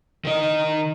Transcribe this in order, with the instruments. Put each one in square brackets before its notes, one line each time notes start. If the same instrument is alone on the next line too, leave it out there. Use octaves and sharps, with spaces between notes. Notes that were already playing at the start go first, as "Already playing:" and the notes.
[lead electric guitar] D#3 D#5